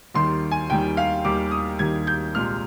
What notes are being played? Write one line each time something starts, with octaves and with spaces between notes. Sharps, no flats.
D#2 D#3 G3 C6
G#5
D#2 D#3 G3 G5
F5
D#2 D#3 G3 D6
D#6
D#2 D#3 G3 G#6
G6
C2 A#2 G#3 F6